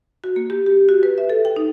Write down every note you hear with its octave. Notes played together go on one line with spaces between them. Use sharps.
F#4
A#3
G4
G4
F#4
B4
E5
A4
G5
D#4